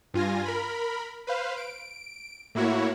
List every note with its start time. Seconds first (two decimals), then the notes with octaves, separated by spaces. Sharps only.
0.14 G2 F4 G#5 A#6
0.46 A#4 B5
1.27 B4 C5 F5
1.57 D7
2.55 A2 A#3 E4 F#4 C#5